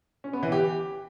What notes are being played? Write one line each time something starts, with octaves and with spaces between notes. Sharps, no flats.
C#4
B3
E3
G4